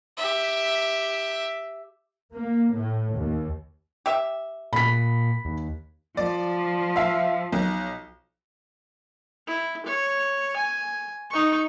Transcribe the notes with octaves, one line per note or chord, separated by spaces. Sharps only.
G4 E5
A#3
A2
D#2
G4 E5
A#2 B5 B6
D#2
F3 D5
E5 F5
B1
E4
C#5
G#5
D#4 C#6